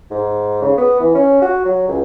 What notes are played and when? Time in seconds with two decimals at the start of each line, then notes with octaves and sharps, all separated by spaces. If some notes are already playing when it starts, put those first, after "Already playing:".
0.11 G#2
0.62 C#3
0.77 B3
1.00 E3
1.15 C#4
1.42 F#4
1.65 F#3
1.88 C#2